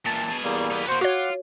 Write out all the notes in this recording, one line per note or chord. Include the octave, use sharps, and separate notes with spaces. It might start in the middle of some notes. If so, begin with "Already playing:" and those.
A#2 E3 A5 A6
B2 G#4
E2 G3 A#3
D#4 B4
A#3 F#4 C5
F4 F#4 C#5 F#5 D6